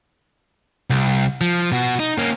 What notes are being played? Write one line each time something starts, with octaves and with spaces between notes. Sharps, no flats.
C2
F3
B2 F#4
D#4
A#3 C#4